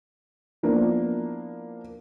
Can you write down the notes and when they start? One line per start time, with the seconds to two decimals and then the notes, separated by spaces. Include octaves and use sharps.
0.63 F3 A#3 B3 D4 E4